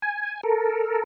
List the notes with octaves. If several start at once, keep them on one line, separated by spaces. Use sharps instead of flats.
G#5
A4 A#4